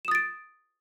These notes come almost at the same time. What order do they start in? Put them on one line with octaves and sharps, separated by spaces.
E7 D#6 A6 D7